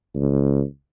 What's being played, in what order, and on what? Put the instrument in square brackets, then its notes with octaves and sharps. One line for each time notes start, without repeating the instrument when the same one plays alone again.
[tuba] C#2